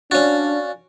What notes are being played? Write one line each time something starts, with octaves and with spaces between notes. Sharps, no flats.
C#4 D4 F#4 D5 F5 A6